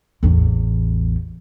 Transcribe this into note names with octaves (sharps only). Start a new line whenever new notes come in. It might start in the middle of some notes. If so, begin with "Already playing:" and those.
A1 E2